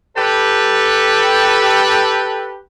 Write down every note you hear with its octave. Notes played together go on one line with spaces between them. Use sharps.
G4 A4 B4